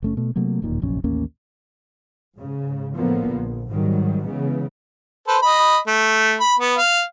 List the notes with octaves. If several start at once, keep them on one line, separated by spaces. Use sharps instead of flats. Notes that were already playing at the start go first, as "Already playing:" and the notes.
F#1 A3 C#4
B2 A3
C3 F#3 A3 A#3
D1 D#2 A#2 D#3
F1 A#1 F#2 C#4
A1 D#2 A#3 C#4
G#2 C#3
A2 D3 F3 A#3 B3
A#1
G#2 D#3 F#3 G3
C#3 E3 G#3 B3
A4 B4 C5
D#5 B5
A3
B5
B3
F5